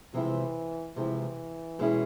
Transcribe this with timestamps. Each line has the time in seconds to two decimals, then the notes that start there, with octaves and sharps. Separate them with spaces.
0.13 C3 E3 F3 G#3 C4 E4
0.96 C3 E3 F3 G#3 C4 E4
1.79 B2 G#3 C#4 E4 G#4